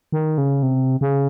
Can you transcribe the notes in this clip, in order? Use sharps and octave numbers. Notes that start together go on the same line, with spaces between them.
D#3
C#3
C3
C#3